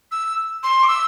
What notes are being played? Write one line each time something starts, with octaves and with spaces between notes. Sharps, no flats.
E6
C6
D6
E6